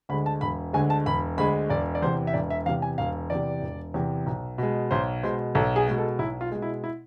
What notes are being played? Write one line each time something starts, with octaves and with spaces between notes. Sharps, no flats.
D2 D3 G#3 B5
A5
E1 B5
D2 D3 G#3 G#5
A5
E1 B5
D2 D3 G#3 B5
E1 D5
D5
E2 C3 C5
E5
E1 D5
E5
E2 C3 F5
G#5
E1 F5
E2 C3 D5
E1
E2 C3
B1
B2 G#3
B1 C5
B2 G#3 C5
B1 A4
G#4
B2 G#3
A4
B1 E4
F4
B2 G#3
E4
E4